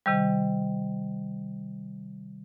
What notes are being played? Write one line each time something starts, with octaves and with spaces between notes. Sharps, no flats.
C3 D#3 G3